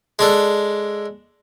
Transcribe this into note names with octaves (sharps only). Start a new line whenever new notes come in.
G#3 D4 A4